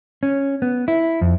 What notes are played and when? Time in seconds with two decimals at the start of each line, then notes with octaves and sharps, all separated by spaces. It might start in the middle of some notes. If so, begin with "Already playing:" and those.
0.23 C#4
0.62 B3
0.88 E4
1.21 F2